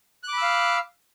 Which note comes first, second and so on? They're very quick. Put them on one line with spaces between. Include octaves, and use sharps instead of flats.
F#6 D6 B5 E6 F5